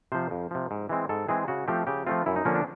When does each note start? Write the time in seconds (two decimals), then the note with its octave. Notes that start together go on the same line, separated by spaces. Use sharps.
0.12 C3 F3 C5
0.31 F2
0.51 C3 F3
0.71 G#2
0.89 E3 G#3 C4
1.09 G#2 A4
1.28 E3 G#3 C4 G#4
1.48 C#3 F#4
1.68 F3 A3 C4 G4
1.87 C#3 G4
2.07 F3 A3 C4 F4
2.26 F#2 E4
2.36 D#4
2.45 D3 F3 A#3 C#4
2.55 D4